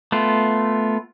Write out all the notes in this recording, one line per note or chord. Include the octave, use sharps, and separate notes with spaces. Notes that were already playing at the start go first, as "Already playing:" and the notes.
A3 B3 F4